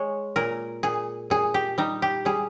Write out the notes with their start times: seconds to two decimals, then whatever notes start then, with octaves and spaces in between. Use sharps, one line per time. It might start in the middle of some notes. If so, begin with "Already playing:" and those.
Already playing: G#3 C#5
0.36 A#2 A#4
0.83 A#2 G#4
1.30 A#2 G#4
1.54 G4
1.78 G3 D#4
2.02 G4
2.25 G3 G#4